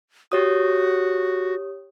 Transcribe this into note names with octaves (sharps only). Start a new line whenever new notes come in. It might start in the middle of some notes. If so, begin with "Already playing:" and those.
F#4 G4 C#5 D#6